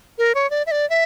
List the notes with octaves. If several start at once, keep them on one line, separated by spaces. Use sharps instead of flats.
A#4
C#5
D5
E5
D5
E5